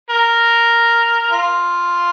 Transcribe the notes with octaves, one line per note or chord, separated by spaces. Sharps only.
A#4
F4